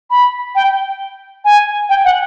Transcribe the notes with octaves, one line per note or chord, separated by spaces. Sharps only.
B5
G5
G#5
G5
F#5